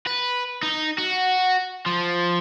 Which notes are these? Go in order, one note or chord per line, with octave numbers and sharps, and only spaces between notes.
B4
D#4
F#4
F3